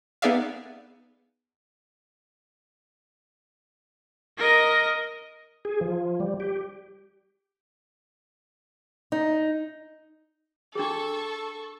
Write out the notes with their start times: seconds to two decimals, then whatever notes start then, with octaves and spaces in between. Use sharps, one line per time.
0.22 B3 D#4 G#4 D5 E5 F5
4.38 A#4 D#5
5.65 G#4
5.81 F3
6.20 G3
6.40 G4
9.12 D#4
10.75 D4 G#4 A4 C#6